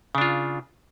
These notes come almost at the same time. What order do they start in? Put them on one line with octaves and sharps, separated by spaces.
C#3 D4 F4